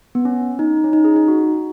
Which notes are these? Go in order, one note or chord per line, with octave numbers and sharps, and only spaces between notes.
B3
C#4
D#4
C#4
D#4
G#4
D#4
F#4